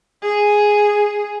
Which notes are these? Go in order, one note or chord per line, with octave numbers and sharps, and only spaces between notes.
G#4